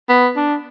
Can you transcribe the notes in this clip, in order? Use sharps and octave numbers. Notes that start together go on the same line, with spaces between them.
B3
D4